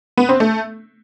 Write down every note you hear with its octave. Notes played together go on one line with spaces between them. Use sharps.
B3
C4
A3